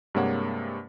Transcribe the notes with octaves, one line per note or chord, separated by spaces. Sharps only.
G2 C3 G#3 A#3 C#5 F#5